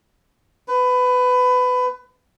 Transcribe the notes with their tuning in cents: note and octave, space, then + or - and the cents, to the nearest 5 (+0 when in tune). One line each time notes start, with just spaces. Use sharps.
B4 +20